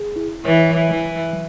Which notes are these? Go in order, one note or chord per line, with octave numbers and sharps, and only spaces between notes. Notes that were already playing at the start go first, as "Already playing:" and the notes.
Already playing: G#4
E4
E3 C#5
F#3
E3
F#3
F#3